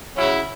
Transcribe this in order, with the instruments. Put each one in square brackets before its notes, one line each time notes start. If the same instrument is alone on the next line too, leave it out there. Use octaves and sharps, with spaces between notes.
[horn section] C#3 F#3 C#4 E4